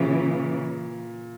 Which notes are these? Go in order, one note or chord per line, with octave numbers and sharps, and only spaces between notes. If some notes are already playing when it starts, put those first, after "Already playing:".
Already playing: A#2 C#3 E3